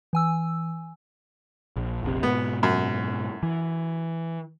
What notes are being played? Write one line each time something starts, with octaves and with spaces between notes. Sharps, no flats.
E3 G#5 E6
A#1
F1 A#1 C3
G#2 B2 B3
F#2
E3